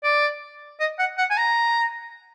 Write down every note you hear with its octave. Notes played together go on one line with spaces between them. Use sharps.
D5
D#5
F#5
F#5
G#5
A#5